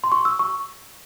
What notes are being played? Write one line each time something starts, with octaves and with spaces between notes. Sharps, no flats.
C6
C#6
E6
C#6